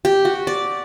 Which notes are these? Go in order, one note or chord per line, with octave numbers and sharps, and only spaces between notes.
G4
F#4
D5